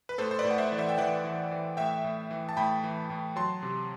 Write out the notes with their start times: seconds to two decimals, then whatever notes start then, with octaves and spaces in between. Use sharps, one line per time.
0.09 B4
0.18 A2 A4 C5
0.31 C5
0.39 B4 D5
0.45 A2
0.51 F#5
0.58 C5 E5
0.72 E3
0.78 C5 E5
0.89 G5
0.98 E3 D5 F#5
1.24 E3
1.51 E3
1.77 A2 E5 G5
2.04 A2
2.31 E3
2.49 A5
2.57 A2 G5 B5
2.84 E3
3.10 A2
3.36 F#3 A5 C6
3.63 C3